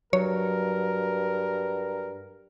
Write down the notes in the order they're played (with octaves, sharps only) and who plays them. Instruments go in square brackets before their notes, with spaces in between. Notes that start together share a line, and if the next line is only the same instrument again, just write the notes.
[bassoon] G2 [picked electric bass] F#3 [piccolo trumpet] A#4 [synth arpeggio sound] C#5